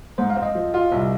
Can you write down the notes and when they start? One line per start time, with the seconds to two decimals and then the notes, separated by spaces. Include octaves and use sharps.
0.18 G#2 C5
0.30 F5
0.36 C4
0.43 D#5
0.55 F3
0.74 F4
0.92 C2